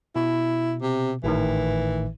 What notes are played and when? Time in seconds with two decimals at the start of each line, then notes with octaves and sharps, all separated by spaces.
0.16 B2 E4
0.82 C3
1.24 G#1 A2 D#3 E3